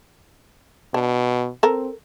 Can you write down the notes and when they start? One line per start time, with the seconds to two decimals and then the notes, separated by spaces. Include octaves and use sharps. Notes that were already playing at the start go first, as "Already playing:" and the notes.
0.94 B2 D4
1.63 C4 A4 A#4